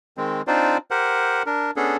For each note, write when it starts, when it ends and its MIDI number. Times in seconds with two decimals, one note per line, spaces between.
0.17 0.42 51
0.17 0.42 56
0.17 0.42 60
0.47 0.78 60
0.47 0.78 62
0.47 0.78 63
0.47 0.78 65
0.47 0.78 72
0.47 0.78 74
0.91 1.43 67
0.91 1.43 70
0.91 1.43 72
0.91 1.43 78
1.46 1.71 62
1.46 1.71 70
1.76 1.97 59
1.76 1.97 61
1.76 1.97 62
1.76 1.97 68
1.76 1.97 69